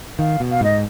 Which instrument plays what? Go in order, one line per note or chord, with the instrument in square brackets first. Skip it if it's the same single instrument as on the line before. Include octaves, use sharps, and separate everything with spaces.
[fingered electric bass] D#3 [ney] F5
[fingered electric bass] B2
[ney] F5
[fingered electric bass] G#2 [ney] D#5